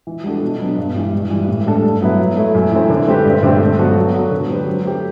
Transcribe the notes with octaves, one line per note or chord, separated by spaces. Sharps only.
E3
G3 D4 F#4 A4
B2
F#3 B3 D4
G2
E3 G3
G2
E3 G3
A2
G3 D4 A4
G2
F#3 B3 E4 B4
F#3
A3 E4
F#2
E3 A3 C4 E4
D3
A3 C4 G4 B4
G2
D3 A3 C4 G4
G2
F#3 B3 F#4 A4
F#3
B3 F#4 A4
D3
F#3 C4 G4 B4
F#3
A3 C4 G4